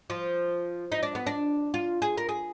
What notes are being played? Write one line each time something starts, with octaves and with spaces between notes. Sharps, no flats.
F3
D#4
D4
B3
D4
F4
G#4
A#4
G#4